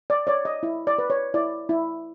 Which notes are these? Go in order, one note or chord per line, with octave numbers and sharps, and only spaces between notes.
D5
C#5 D5
D#5
E4
D5
B4
C#5
E4 D5
E4